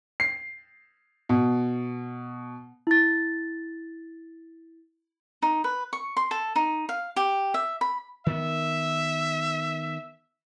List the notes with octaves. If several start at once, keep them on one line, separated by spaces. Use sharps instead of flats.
C7
B2
E4 A6
D#4
B4
C#6
C6
A4
D#4
F5
G4
E5
B5
D#3 B3 E5